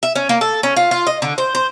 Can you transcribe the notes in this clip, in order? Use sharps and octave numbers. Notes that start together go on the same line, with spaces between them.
E5
C#4
A#3
A4
C#4
F4
F4
D#5
D3
C5
C5